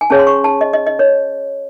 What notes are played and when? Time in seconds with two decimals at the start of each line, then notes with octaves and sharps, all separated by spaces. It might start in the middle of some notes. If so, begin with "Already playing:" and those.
0.01 G#5
0.10 C#4 G#4 C#5 A5
0.19 C6
0.27 C#6
0.44 A5
0.61 D#5
0.73 D#5
0.87 D#5
0.99 C#5